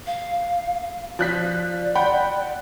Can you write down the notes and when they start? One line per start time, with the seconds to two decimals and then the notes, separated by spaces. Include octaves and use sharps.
0.07 F5
1.19 F3 D5 F#6 B6
1.95 F#5 G5 B5